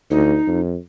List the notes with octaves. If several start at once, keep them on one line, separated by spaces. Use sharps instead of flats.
D2 D#4
F2